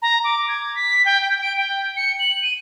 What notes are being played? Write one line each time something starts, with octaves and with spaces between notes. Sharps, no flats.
A#5
D6
G#6
B6
G5
G5
D7
G5
C#7
F#7
D#7